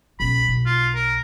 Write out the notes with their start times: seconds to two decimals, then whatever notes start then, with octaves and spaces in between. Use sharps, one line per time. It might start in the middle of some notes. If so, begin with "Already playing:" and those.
0.20 B1 C#4 B5
0.48 B1
0.66 F4
0.95 A#4